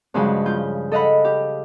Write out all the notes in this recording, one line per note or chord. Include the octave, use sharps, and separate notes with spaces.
G2 C#3 F3 F#3 G#3
F4 G6
A4 D#5 F5 F#5 B5
G4